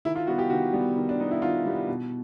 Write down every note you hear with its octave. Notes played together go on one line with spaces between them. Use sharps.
D#3 E4
F4
G3 B3 F#4
G4
D#3 F#4
G3 B3
D#3
D4
G3 B3 D#4
E4
D#3 F4
G3 B3
B2